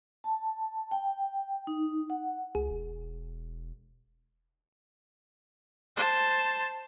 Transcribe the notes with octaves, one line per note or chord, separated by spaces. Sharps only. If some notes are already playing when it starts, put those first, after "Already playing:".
A5
G5
D#4
F#5
C#2 G#4
E1
C5 A5